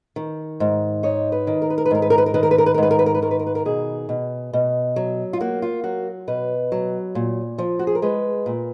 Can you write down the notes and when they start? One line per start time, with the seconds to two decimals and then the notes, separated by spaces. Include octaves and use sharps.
0.16 D#3
0.60 G#2
1.03 D#4 C#5
1.32 B4
1.47 D#3
1.62 A#4
1.70 B4
1.78 A#4
1.86 B4
1.91 G#2 A#4
2.02 B4
2.10 A#4
2.18 B4
2.26 A#4
2.34 D#3 B4
2.43 A#4
2.51 B4
2.58 A#4
2.66 B4
2.74 A#4
2.78 G#2 B4
2.91 A#4
2.99 B4
3.06 A#4
3.15 B4
3.22 D#3 A#4
3.31 B4
3.39 A#4
3.47 B4
3.55 A#4
3.65 B2 G#4
4.09 B2
4.53 B2
4.96 F#3
5.33 F4
5.40 A#3 F#4
5.62 F4
5.84 F#3 F#4
6.28 B2 B4
6.72 F#3
7.15 A#2
7.58 F3
7.79 F#4
7.87 G#4
7.95 A#4
8.02 G#3 B4
8.46 A#2